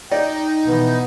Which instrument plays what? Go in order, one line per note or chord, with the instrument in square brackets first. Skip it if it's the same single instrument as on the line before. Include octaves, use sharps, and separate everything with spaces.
[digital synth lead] D#4 [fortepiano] D5 [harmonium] G5
[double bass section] B2 E3 [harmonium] B3